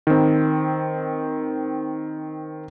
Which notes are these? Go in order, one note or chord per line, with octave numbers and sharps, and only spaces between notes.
D#3 C4